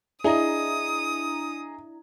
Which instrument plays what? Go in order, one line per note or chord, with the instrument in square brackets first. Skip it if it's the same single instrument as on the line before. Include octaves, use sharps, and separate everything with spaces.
[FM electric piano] D4 E4 A#5 [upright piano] G#4 D#5 [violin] D#6